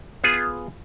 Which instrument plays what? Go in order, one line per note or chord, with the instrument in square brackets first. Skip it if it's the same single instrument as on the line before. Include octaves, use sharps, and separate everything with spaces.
[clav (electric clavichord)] B3 F4 G#4